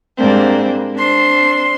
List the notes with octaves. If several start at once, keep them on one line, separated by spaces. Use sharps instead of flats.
G#2 G3 A#3 C4 D4
C4 D4 C6